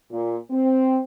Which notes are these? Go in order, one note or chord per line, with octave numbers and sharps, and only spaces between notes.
A#2
C4